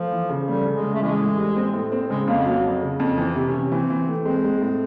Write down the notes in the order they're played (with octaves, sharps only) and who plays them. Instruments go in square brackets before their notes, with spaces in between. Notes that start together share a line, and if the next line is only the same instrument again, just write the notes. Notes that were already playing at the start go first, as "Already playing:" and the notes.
Already playing: [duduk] F3 [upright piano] A3
[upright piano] E3
C#3
[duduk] G3 [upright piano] A3
[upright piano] C#3
[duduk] G#3
[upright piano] C#3
[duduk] A3
[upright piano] E3 [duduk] G#3
[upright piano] A2
G3
C4
A2
C4
[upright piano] C#3 [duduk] G#3
[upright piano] F2 [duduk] A#3
[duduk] B3
[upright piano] F#3 [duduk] A#3
[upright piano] F2
C#3
F2
[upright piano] E3 [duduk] C4
[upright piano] C3
[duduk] C#4
[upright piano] C3
[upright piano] E3 [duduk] C4
[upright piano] E3
A3
[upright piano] G#3 [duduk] C4
[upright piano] G#3
A2